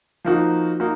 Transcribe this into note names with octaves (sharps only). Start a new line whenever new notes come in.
F3 A#3 D#4 F#4
A#3 D#4 F#4